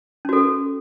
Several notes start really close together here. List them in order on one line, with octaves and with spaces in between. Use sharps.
C#4 F#4 A4